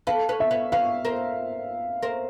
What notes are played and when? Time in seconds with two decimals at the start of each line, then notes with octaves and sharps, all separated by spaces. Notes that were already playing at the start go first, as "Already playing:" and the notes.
0.07 A4 B4 F5
0.29 B4 C#5
0.40 E5
0.51 B4 C#5
0.72 B4 C#5 F5
1.05 A#4 C5
2.03 A#4 C5